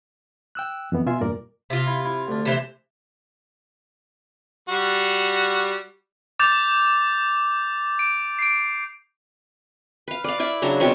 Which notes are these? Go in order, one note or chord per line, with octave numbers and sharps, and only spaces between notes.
G5 E6 F#6
F2 E3 B3
B2 F4 E5 G#5 C6
E2 G2 A#2 A#4 D5
C3 F4
E4
E4
D2 D4
C3 E3 C5
G3 F#4
D6 G6 A6 F7
D7
C7 D7
B4 F5
D5 F5
E4 D5
C#3 F#3 D4 A#5
B2 C4 C#4 A#4